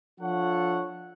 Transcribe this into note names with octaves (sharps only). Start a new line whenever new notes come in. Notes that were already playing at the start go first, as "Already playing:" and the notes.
F3 D4 F4 A4 C#5 F#5